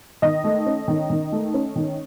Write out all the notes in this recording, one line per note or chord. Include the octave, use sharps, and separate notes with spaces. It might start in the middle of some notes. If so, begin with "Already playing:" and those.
D#3 D#5
A3
C#4
D#3
D#3
A3
C#4
D#3